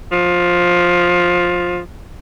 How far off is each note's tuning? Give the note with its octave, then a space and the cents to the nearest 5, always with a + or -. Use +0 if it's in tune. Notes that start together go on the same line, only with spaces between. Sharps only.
F3 +15